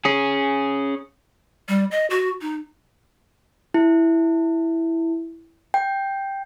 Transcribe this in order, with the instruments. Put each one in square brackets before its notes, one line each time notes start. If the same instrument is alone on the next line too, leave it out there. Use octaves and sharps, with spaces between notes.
[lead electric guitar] C#4 G#4
[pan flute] G3
D#5
F#4
D#4
[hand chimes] E4
G5